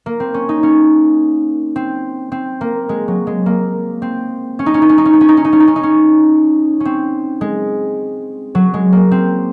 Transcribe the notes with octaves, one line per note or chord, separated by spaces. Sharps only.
A#3
C4
C#4
D#4
C#4
C4
C4
A#3
G#3
F#3
G#3
A#3
C4
C#4
D#4
C#4
D#4
C#4
D#4
C#4
D#4
C#4
D#4
C#4
D#4
C#4
D#4
C#4
D#4
C#4
C#4
C4
G#3
F#3
G#3
A#3
C4